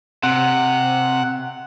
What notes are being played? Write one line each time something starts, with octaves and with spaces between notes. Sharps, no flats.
C3 F#5